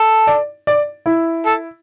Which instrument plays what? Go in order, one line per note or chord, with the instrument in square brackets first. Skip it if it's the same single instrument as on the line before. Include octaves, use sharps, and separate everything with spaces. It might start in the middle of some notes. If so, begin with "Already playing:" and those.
Already playing: [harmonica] A4
[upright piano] D5
D5
E4
[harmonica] A4